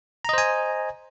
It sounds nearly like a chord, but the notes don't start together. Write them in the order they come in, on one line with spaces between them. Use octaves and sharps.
A#5 D#5 C5 G#5